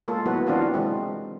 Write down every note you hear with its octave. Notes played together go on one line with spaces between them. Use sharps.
G#3 A#3 F4 A4 A#4
F#3 A3 B3 E4 F#4 B4
E3 C4 D4 F4 F#4 A#4
E3 G#3 C4